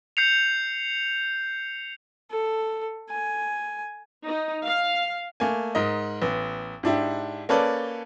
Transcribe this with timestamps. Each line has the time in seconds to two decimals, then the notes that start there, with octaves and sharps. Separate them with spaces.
0.17 G6 C7 C#7 F7
2.31 A4
3.10 G#5
4.25 D#4
4.66 F5
5.40 A3 A#3 G#5
5.75 G#2 A#4 D#5
6.22 A1 B3
6.83 G#2 D4 E4 G4
7.49 A#3 C#4 A4 B4 D5